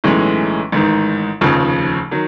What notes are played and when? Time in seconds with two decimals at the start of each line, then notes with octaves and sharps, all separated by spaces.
0.04 B1 A2 E3 G#3 C#4
0.72 A1 G#2 D#3
1.41 F1 D#2 C#3 F3
2.11 D#3 F#3